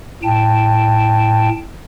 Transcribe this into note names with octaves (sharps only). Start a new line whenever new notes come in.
A2 G5 A5